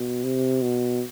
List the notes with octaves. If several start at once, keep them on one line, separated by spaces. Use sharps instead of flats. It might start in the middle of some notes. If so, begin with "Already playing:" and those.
Already playing: B2
C3
B2